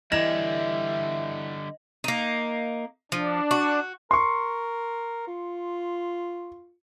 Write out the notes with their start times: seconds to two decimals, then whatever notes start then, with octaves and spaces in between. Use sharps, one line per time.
0.12 D3 E3 G3 D#5 E5 A#6 E7
2.04 A#3 D#4
3.12 F3 D4
3.51 F#4
4.11 A#4 C6 C#6
5.28 F4